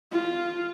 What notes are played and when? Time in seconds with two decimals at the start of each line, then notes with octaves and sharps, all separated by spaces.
0.12 F4